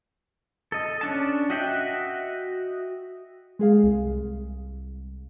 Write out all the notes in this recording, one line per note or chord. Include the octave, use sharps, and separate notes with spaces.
A4 D#5
C#4 D4 A5
F#4 D#5 E5 F#5 G5
G#3 G#4 F5
C2